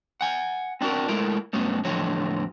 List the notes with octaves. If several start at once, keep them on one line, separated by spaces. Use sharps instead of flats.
F#5 G#5
C4 D4 E4 F#4 A#4
G#3 A3 E4 A#4
G2 F#3 A3 B3 C#4
E2 A2 D3 F3 F#3 C#5